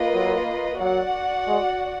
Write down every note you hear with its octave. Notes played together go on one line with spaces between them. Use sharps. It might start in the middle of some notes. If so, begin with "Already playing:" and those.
Already playing: A#3 F4 B4 D#5
F#3
F#3 F#4 D5 F#5
G#3